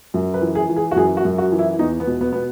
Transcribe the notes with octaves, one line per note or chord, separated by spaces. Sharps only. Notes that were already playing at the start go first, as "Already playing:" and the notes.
F#2
B4
E3
G#4
E3
G#4
F#4
F#2 G#4
F#4
F#2
F#4
E3
E4
E2 D#4
B3
B2
B3
B2 B3